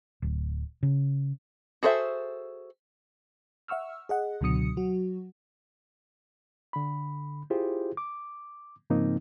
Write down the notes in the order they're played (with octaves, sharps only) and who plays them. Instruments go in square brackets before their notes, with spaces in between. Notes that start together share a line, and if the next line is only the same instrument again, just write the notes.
[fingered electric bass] D1
C#3
[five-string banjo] F#4 G#4 A4 C5 E5
[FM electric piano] E5 F#5 C#6 E6 F6
G#4 D#5 F#5
C#2 B2 D3 F#3 D#6 C#7
F#3 F#4
[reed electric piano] D3 B5
E4 F4 G4 G#4 C5
D6
G#2 C#3 F3 A#3 C4 D#4